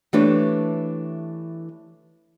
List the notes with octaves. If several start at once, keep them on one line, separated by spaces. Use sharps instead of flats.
E3 A3 D4 G4 B4 C#5